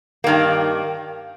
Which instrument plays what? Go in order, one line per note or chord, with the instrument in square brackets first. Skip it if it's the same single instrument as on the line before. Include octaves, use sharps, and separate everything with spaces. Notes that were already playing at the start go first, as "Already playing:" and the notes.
[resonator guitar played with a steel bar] G2 D#3 A#3